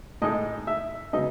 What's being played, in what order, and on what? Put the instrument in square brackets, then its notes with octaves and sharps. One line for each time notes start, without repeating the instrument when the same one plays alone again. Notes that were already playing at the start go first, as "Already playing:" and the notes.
[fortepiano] A2 G#3 D#4 D#5
E5
C#3 F#3 B3 D#4 D#5